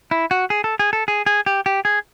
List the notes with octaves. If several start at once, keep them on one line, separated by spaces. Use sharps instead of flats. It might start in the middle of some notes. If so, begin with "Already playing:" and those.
E4
F#4
G#4
A4
G#4
A4
G#4
G#4
G4
G4
G#4